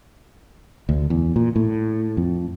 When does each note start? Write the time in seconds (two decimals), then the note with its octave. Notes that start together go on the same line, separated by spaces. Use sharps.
0.89 D2
1.10 E2
1.36 A#2
1.56 A2
2.17 F2